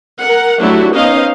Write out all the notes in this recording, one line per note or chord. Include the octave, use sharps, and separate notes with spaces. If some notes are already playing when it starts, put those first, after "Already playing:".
A#4 F#5
F#3 A3 D4 E4 F#4 G4
B3 C#4 D#4 C5 D#5 F5